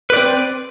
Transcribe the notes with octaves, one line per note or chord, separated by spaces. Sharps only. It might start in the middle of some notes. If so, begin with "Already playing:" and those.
C4 B4 D5